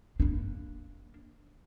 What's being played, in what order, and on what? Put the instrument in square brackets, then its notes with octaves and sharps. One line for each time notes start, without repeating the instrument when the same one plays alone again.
[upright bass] A#3 D4